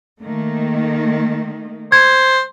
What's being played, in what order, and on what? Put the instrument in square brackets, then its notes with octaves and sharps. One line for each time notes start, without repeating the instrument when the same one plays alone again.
[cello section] D#3 A3 A#3
[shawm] C5 [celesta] G#6